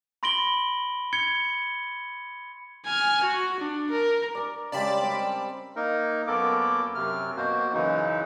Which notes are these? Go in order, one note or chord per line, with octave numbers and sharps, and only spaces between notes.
B5 C6 A#6 D7 F#7 G7
G#6 C#7 G7
G#5 F6
F#4
D4
A#4
A#4 D5
C#3 G3 G#3 D5 A5 B5
G3 C4
A#3 D#4 A#4
F#2 A#3 B3 A4 A#4 D6
F#2 C3 F6
B2 A#3 F#4 C5
F#2 C#3 E3 D#4